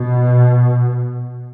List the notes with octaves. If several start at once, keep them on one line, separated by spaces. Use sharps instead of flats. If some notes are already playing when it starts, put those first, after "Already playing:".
Already playing: B2